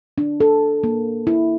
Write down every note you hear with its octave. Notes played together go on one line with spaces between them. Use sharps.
D4
A4
A#3
E4